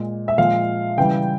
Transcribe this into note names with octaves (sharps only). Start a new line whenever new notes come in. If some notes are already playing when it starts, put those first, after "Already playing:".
Already playing: A#2 G#3
E5
A#2 F3 G#3 F5
C#3 E3 G3 G5